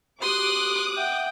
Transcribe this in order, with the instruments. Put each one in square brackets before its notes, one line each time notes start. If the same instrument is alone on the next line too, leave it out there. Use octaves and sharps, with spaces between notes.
[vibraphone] F#4 G4 [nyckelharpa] C6 [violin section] D6 D#6 F#6
[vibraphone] E5 F#5 [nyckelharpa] G5